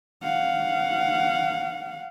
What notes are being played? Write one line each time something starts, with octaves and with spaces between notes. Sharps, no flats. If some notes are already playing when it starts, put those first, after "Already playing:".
F5 F#5